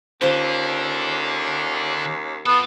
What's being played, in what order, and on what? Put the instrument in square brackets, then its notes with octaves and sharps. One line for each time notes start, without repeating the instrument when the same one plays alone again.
[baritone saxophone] D#2 [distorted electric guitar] D3 [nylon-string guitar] C#4 F4 C5
[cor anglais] B3 [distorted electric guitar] F4 A4